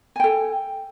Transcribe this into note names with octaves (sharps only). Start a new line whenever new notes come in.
A4 G5 G#5